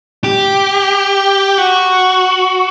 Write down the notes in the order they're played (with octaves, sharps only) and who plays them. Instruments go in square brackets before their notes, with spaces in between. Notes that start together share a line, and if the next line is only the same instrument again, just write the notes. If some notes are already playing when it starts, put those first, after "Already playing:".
[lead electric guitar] G4
F#4